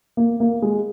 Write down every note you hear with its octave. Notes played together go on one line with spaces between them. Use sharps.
A#3
A#3
G#3